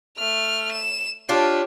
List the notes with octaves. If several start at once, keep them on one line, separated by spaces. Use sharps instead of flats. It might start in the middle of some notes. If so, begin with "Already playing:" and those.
A3 F6
E7
D4 F4 G4 C#5 F5